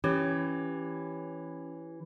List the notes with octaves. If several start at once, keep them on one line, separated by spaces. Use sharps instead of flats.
E3 C#4 G4 C#5